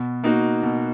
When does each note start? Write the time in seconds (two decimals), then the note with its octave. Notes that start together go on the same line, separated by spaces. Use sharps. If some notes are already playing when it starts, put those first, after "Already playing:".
Already playing: B2
0.24 A#3 D#4 F#4
0.63 B2